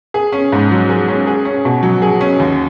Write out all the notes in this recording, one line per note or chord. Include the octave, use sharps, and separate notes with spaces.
G#4
C#4
G#2
F#3
G#4
C#4
G#4
C#4
B2
F#3
G#4
C#4
D#2